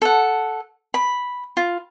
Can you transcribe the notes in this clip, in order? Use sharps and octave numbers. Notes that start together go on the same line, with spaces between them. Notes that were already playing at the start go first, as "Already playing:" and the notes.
A4 F#5
B5
F4